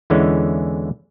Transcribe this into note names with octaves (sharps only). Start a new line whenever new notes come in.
E2 D3 E3 G#3 C#4